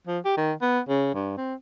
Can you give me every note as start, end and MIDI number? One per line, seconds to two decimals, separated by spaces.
0.07 0.19 53
0.25 0.34 67
0.37 0.53 51
0.61 0.80 59
0.89 1.13 49
1.15 1.37 43
1.37 1.54 60